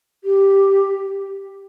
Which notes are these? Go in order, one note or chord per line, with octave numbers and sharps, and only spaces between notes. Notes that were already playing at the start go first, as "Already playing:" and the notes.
G4